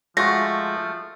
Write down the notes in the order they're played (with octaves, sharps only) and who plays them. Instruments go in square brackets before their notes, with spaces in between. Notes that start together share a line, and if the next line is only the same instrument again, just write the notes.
[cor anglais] F3 [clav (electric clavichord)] G#3 F4 F#4 [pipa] A3 [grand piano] A#6